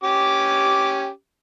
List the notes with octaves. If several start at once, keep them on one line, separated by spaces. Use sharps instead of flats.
C#4 G4 D6